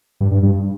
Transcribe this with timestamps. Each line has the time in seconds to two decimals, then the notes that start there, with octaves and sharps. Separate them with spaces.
0.21 G2
0.31 G2
0.43 G2